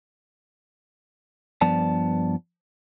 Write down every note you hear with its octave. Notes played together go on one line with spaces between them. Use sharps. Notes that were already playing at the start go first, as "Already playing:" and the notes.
G2 F3 B3 D5 A5